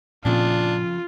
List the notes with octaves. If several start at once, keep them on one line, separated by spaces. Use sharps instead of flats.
F2 A#2 C#3 D4 F4